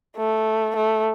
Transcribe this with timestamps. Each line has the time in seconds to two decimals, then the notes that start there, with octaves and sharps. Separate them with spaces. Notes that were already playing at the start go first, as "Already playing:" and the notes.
0.17 A3
0.76 A3